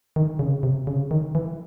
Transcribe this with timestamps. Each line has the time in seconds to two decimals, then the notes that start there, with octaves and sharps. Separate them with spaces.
0.16 D#3
0.39 C#3
0.63 C3
0.87 C#3
1.11 D#3
1.35 E3